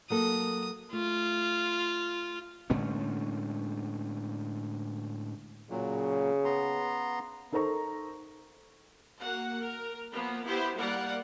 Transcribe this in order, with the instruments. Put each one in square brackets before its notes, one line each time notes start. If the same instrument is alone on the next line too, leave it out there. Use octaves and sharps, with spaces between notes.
[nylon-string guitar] F#3 A#3 A4 [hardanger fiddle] D#6
[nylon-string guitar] A3 [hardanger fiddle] F4
[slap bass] A2 D3 G#3 C#4
[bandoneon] A#2 F#3 [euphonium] C#3
[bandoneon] B3 A#5 C6
[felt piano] D#4 A4 A#4 C5 A#5 C#6
[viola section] A#3 F#4 F#5
A#4
F3 A#3 B3
B3 E4 G4 C5
G3 A#3 A#4 D5 F#5